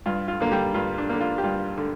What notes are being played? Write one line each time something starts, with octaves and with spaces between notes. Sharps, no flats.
G2 F4
F4
D3 A#3
G3 G4
G2 F4
D4
D3 A#3
F4
G4
G2 F4
D3